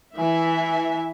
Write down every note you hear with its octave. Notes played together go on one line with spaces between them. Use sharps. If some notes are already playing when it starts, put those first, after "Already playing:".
E3 E5 G#5